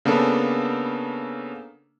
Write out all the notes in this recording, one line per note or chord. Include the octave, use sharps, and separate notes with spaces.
C#3 A#3 B3 D4 A4